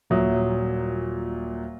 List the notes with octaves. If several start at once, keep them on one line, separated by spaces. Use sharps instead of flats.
D#1 A#2 F#3 E5 D#6